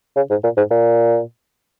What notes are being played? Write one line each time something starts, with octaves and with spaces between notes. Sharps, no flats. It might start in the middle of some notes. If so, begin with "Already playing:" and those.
C#3
G#2
A#2
G#2
A#2